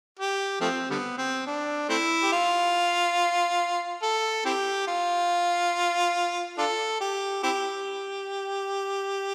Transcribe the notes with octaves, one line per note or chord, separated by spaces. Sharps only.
G4
F3 A3 C4
D3 G3 B3
C4
D4
A3 C4 E4
G4
F4
A4
C4 E4 G4
F4
D4 F4 A4
G4
C4 E4 G4